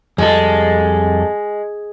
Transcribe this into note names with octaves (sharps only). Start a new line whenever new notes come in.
F2 G3 G#3 A4